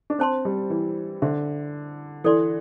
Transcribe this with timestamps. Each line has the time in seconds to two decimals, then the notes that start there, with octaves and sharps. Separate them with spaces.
0.10 D4
0.19 C4 C5 A5 C6
0.45 G3
0.70 E3
1.22 D3 C5 E5 C6
2.24 E3 A4 D5 C6